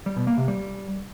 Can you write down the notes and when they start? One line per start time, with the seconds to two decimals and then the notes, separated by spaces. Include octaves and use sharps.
0.06 G3
0.17 B2
0.27 A#3
0.37 C3
0.48 G3